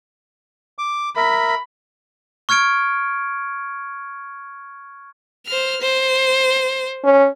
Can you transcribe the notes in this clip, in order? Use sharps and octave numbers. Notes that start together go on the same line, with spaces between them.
D6
A#4 E5 B5
C#6 F6 G#6 C#7 D7
C5 F6
C5
C#4